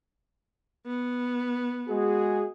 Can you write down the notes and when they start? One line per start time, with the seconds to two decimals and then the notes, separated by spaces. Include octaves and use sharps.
0.86 B3
1.88 G#3 F#4 G#4